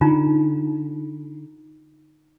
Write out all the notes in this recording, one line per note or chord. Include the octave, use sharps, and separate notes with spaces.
D3 D#4 F4 A#5